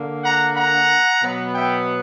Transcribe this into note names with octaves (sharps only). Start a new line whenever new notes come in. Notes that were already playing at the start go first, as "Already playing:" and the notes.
Already playing: D3 A#3
F#5 A#5
F#5 A#5
B2 F#3 B3
E5 G5